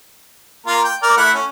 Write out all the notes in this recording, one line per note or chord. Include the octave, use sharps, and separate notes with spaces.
A#3 F4 A#4
G5
A#4 D5
A3 E4 F#5
C#4